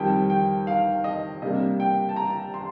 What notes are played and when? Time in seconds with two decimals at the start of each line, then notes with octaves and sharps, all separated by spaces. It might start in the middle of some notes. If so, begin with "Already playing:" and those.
Already playing: F2 D#3 G3 G5
0.30 G5
0.67 F5
1.04 D#5
1.42 C3 G3 A#3 D4 D#5
1.80 G5
2.09 A5
2.16 A#5
2.54 C6